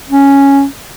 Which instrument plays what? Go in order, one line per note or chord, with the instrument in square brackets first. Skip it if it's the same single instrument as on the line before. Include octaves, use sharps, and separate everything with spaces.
[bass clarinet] C#4